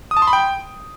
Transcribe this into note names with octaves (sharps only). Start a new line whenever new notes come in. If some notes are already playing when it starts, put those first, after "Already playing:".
D#6
A5
C6
B5
G5